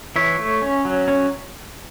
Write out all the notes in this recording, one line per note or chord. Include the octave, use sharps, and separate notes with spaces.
E3 C#5 E5
A3
C#4
F#3
C#4